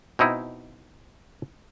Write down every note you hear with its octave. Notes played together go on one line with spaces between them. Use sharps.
B2 C4 D#4 E4